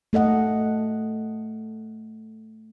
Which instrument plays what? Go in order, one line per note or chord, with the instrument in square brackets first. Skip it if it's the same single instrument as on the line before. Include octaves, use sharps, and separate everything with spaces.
[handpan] A3 A4 D#5 F#5